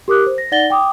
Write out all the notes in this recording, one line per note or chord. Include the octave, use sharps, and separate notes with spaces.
G4 A#4 D6 D#6 F#6
C5
A#6
D#4 D5 F#5 A6 A#6 G7
G5 D6 D#6